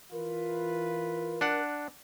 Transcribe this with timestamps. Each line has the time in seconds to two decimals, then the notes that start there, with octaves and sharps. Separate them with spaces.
0.12 E3 F4 A#4 B4
1.41 D4 F#5